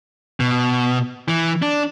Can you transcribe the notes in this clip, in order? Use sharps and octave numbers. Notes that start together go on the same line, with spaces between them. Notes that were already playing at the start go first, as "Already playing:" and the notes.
B2
E3
D4